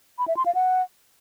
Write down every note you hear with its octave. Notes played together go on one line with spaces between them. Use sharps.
B5
E5
C6
F5
F#5